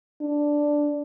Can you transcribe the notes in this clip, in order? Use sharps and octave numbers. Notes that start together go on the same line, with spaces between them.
D4